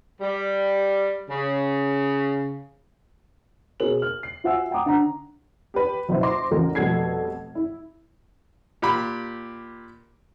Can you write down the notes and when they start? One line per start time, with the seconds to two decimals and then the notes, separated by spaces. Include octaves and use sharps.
0.21 G3
1.29 C#3
3.80 B2 G#4 A#4 F#7
4.02 F6
4.23 C7
4.44 F4 F#4 E5 F#5 G#5 E6
4.71 F#5 G5 A#5 D6 D#6
4.86 D3 F#5 A#5
5.74 G4 B4
6.09 F#1 B2 B4 C5 E5
6.23 C5 C6 D6 A#6
6.51 A1 E2 C#3 A#4
6.75 F1 B2 G3 A4 G#6 C7
7.55 E4
8.82 A#2 G4 B5